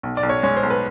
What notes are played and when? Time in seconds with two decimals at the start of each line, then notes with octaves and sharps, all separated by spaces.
0.03 B1
0.17 D5
0.23 B1
0.29 C#5
0.43 G#3 C#5
0.56 C5
0.63 B1
0.70 B4